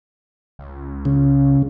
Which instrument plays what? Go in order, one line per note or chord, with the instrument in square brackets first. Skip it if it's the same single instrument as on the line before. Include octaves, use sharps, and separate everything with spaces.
[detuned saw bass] C#2
[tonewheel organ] C#3